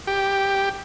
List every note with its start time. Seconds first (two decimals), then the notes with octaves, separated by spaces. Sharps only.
0.07 G4